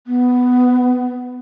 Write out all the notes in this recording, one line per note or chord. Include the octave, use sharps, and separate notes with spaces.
B3